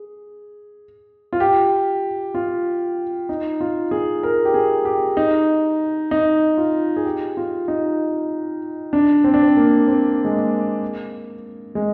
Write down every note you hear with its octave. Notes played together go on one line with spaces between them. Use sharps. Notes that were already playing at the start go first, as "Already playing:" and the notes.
Already playing: G#4
F4
G4
F4
D#4
F4
G#4
A#4
G4
G#4
G4
D#4
D#4
F4
G#4
G4
F4
D#4
D4
C4
D4
C4
A#3
C4
G#3
A#3
G#3